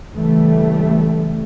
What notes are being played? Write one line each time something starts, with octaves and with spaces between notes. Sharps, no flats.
C#3 E3 G3 A3